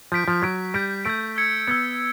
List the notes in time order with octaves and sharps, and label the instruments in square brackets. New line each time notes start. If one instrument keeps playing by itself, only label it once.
[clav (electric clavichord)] F3 [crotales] G6 B6 D7
[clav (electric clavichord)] F3
[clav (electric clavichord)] F#3 [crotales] G6 B6 D7
[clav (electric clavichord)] G3 [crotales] G6 B6 D7
[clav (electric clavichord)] A3 [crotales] G6 B6 D7
[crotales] E6 G#6 C#7
[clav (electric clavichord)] B3 [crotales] E6 G#6 C#7